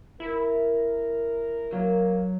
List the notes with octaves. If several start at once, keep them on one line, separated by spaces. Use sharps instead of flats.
E4 A#4
F#3 A#3